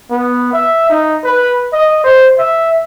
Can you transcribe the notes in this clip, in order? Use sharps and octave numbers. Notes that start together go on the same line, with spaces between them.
B3
E5
D#4
B4
D#5
C5
E5